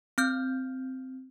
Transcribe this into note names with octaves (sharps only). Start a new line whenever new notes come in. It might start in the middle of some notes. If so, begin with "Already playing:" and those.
C4 F6 G6